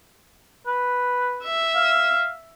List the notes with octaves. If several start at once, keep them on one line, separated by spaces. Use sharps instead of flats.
B4
E5
F5